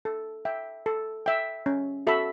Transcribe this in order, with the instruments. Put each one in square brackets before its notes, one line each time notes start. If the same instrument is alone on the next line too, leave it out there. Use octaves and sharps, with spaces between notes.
[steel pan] A4
E5 G5
A4
E5 G5
C#4
F#4 A4 E5 B5